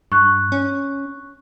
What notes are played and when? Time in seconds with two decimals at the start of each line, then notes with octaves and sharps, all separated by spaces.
0.12 G2 C#6 F#6
0.52 C#4